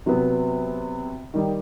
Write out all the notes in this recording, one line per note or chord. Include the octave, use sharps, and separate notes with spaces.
C3 F#3 B3
D#3 G3 D#4